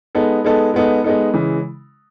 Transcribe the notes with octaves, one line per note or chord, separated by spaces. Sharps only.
G#3 B3 D#4 A4
G#3 B3 D#4 A4
G#3 B3 D#4 A4
G#3 B3 D#4 A4
C#3 E3 G#3